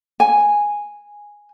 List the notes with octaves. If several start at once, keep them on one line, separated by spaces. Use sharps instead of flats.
G#5